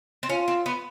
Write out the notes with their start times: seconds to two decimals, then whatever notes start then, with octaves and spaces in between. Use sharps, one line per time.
0.23 C4
0.30 C#4 F4
0.48 C4
0.66 B3